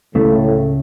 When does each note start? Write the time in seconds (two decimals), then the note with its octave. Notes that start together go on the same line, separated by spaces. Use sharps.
0.15 C#2 A2 C#3 A3